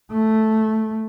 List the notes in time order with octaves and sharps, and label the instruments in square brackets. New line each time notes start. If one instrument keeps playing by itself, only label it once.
[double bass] A3